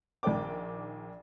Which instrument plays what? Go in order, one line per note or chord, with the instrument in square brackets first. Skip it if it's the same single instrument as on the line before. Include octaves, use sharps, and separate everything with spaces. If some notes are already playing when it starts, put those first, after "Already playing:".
[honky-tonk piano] A#1 D#3 A#4 D5 G5 D6